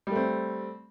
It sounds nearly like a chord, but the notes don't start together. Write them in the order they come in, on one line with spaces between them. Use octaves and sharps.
G3 A3 C4